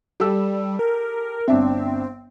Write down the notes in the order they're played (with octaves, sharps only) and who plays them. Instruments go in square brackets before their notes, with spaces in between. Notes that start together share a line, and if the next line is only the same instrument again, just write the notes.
[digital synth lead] G3 [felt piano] G4 A4 E6
[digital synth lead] A#4
[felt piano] G1 D4 E5 [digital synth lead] C4